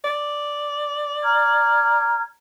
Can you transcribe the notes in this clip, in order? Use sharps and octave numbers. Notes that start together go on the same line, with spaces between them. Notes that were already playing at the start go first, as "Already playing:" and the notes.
D5
A#5 F6 G#6